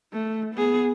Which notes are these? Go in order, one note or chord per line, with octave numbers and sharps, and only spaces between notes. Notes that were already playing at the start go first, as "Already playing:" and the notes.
A3
B3 G#4